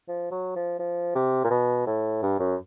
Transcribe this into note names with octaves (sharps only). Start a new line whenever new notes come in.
F3
F#3
F3
F3
C3
A#2
B2
A2
G2
F#2